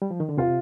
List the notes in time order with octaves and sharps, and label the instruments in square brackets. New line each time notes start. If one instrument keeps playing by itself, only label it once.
[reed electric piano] G3
F3
D#3
D3
[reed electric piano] C3 [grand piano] F4